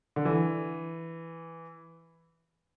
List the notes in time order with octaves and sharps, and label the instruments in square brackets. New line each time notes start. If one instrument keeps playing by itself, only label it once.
[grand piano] D3
E3